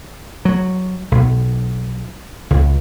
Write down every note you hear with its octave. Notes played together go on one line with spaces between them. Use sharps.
F#3
B1
C#2